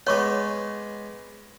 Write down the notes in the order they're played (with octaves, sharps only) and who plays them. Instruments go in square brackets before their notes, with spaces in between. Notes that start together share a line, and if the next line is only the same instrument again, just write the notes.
[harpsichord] G#3 B3 [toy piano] C#5 C#6 D6